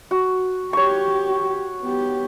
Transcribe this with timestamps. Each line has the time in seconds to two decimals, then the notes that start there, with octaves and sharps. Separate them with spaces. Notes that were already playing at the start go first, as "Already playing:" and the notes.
0.11 F#4
0.73 G4 C#5 C#6
1.82 B3 G4